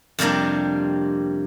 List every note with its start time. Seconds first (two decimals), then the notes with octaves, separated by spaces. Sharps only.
0.19 F2 C3 G3 A#3 D4